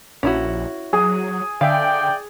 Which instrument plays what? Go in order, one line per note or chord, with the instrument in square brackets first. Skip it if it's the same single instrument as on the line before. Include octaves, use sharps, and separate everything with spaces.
[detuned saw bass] A#1 [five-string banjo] C#4 E4 F#4
[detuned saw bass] F#3 [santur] G#4
[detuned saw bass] D3 [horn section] D5 G5 [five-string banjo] E5 F5